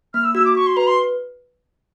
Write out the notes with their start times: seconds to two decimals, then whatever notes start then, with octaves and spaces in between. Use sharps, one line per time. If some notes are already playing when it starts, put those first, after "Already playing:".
0.14 A#3 F6
0.24 E6
0.35 F#4 E6
0.45 D6
0.55 F#4 C#6
0.67 C6
0.76 B4 A#5
0.87 C6